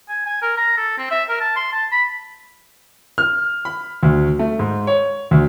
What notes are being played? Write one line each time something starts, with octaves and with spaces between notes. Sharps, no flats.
G#5
G#5
A#4
A#5
A4
C4
E5
A#4
A5
C6
A5
B5
F6
B5
D2
A3
G#2
C#5
D2